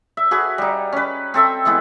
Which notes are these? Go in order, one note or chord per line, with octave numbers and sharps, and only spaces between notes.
E5
F#4 G#4 B4 G#5
G3 D#4
C#4 B4
C4 A4 E5 G5
E3 G#3 B3 E4